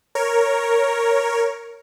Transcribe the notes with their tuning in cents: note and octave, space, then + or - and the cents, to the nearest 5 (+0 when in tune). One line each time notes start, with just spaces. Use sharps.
A#4 +0 C#5 +0